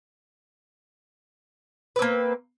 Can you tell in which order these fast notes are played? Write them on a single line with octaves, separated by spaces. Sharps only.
B4 C4 A#3